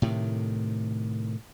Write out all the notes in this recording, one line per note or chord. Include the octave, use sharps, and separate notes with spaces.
A2 C3 D#3